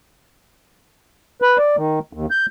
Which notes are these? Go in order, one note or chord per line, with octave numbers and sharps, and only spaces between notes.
B4
D5
D#3
D#2
G6